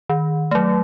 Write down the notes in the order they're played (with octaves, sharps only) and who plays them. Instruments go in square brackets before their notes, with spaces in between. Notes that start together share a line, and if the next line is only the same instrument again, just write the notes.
[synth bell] D#3
F#3 A3